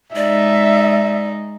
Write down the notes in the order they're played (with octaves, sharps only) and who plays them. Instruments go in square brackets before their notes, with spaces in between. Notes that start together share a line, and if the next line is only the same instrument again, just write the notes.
[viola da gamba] G#3 D#4 [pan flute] D5 [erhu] E5